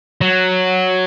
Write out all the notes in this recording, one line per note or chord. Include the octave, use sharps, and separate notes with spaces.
F#3